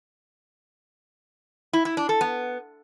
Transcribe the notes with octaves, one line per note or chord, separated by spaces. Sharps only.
E4
E4
D4
A4
B3